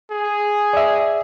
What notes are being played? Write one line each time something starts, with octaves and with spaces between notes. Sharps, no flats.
G#4
D5 E5